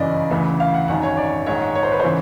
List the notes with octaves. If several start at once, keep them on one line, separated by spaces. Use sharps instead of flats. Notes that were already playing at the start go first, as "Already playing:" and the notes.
Already playing: G1 F#2 C#3 E3 D5 D#5
D2 C#3 E3
F5
F#5
G#1 F#2 D#3 F#5
C#5
D5
A#1 G#2 D#3 C#5
C#5
C5
B4
C#3 E3 C5